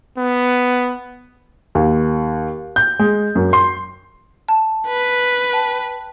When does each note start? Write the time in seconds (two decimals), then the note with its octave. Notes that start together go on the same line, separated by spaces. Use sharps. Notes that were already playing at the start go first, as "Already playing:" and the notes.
0.17 B3
1.75 D#2
2.76 G6
2.99 G#3
3.35 F#2
3.53 C6
4.48 A5
4.87 B4
5.53 G5 A5